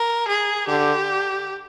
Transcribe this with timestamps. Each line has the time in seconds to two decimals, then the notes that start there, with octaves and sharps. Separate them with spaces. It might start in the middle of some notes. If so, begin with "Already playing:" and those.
Already playing: A#4
0.28 G#4
0.68 D3 G4